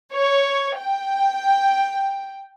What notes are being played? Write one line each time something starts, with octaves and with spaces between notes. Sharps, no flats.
C#5
G5